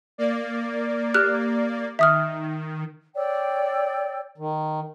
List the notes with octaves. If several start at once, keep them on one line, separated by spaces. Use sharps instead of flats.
A#3 D5
G4 F6 F#6
D#3 E5 D#6 F6
C#5 D5 G5 E6
D#3